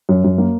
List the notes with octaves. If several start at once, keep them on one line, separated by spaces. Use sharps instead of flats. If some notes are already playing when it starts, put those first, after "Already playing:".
F#2
F#2
A#3